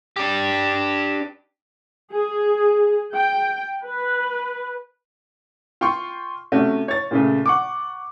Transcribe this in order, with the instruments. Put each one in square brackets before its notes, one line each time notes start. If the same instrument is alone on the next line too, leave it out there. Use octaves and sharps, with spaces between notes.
[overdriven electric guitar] D4 G4
[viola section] G#4
G5
B4
[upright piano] F4 G5 C6 C#6
C3 A3 C#4 F#4
C#5 A6
A#2 C#3 A3
F#5 C#6 D6